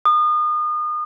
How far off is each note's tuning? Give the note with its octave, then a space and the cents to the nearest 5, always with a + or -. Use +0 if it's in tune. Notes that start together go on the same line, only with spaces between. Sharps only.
D#6 -35